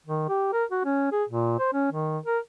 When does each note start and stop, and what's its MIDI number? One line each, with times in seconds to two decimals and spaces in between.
0.06 0.24 51
0.29 0.49 67
0.53 0.64 70
0.71 0.81 66
0.85 1.09 61
1.12 1.24 68
1.29 1.54 46
1.59 1.71 72
1.73 1.87 61
1.92 2.18 51
2.26 2.39 70